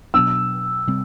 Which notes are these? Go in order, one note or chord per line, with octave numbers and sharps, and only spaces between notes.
B2 F#3 B3 D4 E6
C3 G3 C4